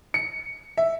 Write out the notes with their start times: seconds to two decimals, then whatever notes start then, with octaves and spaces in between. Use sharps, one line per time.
0.14 C#7
0.77 E5